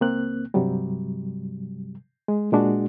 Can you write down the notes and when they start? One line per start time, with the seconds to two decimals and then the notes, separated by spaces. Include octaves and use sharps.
0.01 C#2 A#3 C4 F#6
0.54 G2 C3 F#3 G3
2.28 G#3
2.52 A#2 G#3 D4 F#4